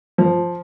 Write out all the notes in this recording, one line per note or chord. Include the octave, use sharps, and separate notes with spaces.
F3